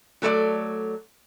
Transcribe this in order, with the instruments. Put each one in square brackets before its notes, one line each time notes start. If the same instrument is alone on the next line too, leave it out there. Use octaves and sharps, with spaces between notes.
[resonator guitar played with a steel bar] F#3 A3 A4 C5 D5